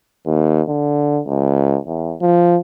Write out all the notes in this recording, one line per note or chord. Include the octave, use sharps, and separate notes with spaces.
D#2
D3
C#2
E2
F3